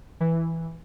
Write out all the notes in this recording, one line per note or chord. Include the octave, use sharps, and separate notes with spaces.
E3